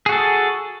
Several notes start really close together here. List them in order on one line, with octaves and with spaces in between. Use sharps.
G#4 F#4 A4